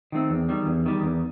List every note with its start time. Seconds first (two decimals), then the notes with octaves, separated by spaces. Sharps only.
0.12 D#3 A3 C4
0.30 E2
0.49 D#3 G3
0.66 E2
0.86 D#3 G3
1.03 E2